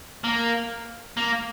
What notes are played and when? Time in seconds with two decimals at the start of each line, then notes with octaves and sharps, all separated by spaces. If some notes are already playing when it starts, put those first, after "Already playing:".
0.24 A#3
1.17 A#3